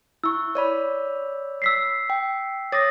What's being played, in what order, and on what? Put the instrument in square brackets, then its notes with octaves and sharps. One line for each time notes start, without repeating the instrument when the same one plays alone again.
[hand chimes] E4 C#6 [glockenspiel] E6
[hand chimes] C#5 D5 B5
[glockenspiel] E6 B6 C7
[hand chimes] G5
[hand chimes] C#5 D6 D#6 [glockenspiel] A6 A#6